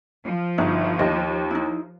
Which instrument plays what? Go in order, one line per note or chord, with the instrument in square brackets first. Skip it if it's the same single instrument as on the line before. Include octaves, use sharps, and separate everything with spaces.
[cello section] F3
[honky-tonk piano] G1 [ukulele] D#4 F#4
[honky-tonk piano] D#2 [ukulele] D#5
[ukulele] D#4 E4